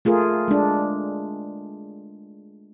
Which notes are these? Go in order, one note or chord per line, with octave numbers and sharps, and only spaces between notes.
A3 F4 G#4 A#4
G#3 D4